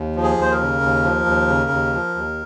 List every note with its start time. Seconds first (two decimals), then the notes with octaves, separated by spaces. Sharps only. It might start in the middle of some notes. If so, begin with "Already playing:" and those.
Already playing: D#2
0.16 F3
0.23 G#4
0.37 D#2 C5
0.52 A#4
0.60 C#3
0.82 D#2
1.03 F3
1.26 D#2
1.48 C#3
1.71 D#2
1.93 F3
2.15 D#2